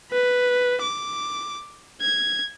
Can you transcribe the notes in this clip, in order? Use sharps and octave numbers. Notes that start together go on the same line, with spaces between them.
B4
D6
G#6